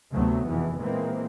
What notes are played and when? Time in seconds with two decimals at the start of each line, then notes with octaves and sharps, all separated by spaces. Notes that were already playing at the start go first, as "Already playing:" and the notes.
0.11 D2 C3 F#3 A3 B3
0.47 F1 E2 B2 E3
0.80 A#2 E3 G#3 A#3 C4